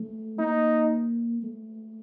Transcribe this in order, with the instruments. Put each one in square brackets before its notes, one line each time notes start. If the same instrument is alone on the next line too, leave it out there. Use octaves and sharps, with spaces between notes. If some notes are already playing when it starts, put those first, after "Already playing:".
Already playing: [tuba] A3
[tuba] A#3 [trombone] D#4
[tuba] A3